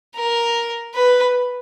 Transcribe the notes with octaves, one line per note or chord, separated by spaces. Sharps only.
A#4
B4